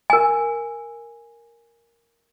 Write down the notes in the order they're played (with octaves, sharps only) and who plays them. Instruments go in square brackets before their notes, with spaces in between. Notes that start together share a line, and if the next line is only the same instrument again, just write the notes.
[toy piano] A#4 G#5